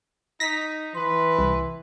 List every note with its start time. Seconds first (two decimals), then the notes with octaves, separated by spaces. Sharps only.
0.40 D#4 A#6 B6
0.95 E3 B4 C6
1.39 C2